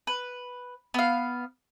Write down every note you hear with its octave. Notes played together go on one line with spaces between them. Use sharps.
B4
B3 F5